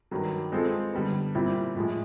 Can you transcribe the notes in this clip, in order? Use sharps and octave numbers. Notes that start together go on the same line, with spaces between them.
G2 D#3 F#3
G#3 C4 F4 A4
D3 G3 B3
A#2 G3 C4 E4
A2 F3 G#3